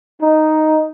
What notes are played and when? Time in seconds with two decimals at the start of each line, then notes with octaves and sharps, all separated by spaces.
0.22 D#4